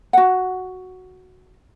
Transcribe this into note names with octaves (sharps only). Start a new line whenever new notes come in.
F#4 F#5